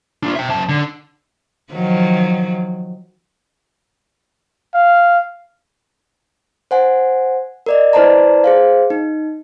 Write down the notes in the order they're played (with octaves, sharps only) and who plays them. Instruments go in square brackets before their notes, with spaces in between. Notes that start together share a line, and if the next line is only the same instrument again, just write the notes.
[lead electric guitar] D4 F4
E5 G5
F#2 A5
D3
[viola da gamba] D#3 F3 F#3
[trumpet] F5
[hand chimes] C5 F#5 G#5
A#4 D5 D#5
E4 B4 C5 D5 A5 A#5
G#4 C5 F5
D#4